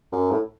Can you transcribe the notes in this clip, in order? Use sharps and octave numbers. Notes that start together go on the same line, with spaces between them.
F#2
A2